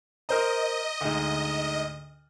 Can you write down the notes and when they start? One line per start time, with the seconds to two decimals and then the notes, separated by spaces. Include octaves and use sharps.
0.29 A#4 C5 D#5 A#5
1.01 D2 G#2